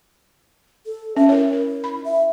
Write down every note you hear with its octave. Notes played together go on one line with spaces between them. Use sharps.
A4
C#4 E5
E4 A#4 C#5
A#4
B5
E5